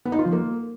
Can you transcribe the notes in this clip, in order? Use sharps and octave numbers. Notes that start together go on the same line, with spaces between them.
B3
D#4
F4
F3
A#3